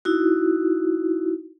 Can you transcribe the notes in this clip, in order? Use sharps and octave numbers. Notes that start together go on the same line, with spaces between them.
D#4 E4 F#4